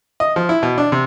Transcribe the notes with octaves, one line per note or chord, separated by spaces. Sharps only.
D#5
F3
E4
B2
D4
C3